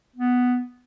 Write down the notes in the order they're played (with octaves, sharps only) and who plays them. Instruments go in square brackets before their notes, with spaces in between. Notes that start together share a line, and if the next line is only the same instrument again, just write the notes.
[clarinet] B3